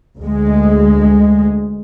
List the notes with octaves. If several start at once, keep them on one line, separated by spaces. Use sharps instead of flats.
D2 G#3